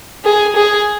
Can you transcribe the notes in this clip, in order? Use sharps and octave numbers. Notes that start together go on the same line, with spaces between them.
G#4
G#4